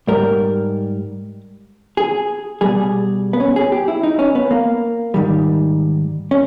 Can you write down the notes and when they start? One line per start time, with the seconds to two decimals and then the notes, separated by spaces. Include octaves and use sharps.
0.07 G#2 G3 A#4
1.97 G#4
2.61 B2 G3 G#4
3.33 B3
3.40 C#4
3.56 G#4
3.72 G4
3.88 E4
4.03 D#4
4.19 C#4
4.35 B3
4.51 A#3
5.14 G#2 D#3 G3
6.31 C#4